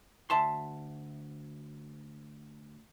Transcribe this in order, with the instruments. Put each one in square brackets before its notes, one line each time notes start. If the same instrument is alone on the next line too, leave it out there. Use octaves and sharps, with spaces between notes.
[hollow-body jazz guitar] D2 E5 A5 C6